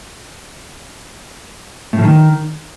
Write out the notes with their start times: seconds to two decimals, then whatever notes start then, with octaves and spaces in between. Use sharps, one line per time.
1.93 A2
1.99 F3
2.04 D#3